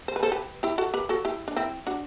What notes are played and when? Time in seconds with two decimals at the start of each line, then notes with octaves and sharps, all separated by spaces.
0.08 C5
0.16 B4
0.23 A4 C5
0.32 G4 B4
0.63 E4 G4
0.78 F#4 A4
0.94 G4 B4
1.09 F#4 A4
1.25 E4 G4
1.48 D4
1.56 C4 E4
1.87 D4 F#4